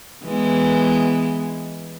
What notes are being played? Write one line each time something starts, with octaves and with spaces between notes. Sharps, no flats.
E3 G#3 B3